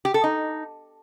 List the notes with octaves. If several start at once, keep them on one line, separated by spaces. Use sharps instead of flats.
G4
A4
D#4